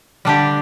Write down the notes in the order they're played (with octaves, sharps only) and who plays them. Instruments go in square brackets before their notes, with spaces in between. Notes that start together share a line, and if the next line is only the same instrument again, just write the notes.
[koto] D3 G3 D4 G4